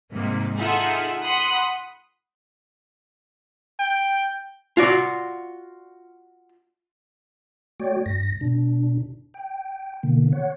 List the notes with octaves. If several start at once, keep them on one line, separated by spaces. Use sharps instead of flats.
G#2 C3 D#3 G3 A#3
D#4 F4 G#4 A4 E5 F#5
F#5 B5 C6 D#6 F#6
G5
F4 F#4 D5
A3 F#4 C#5 D5 G5
G2 A#6
B2 D4
G5
B2 D3 D#3 A#3
C#5 F#5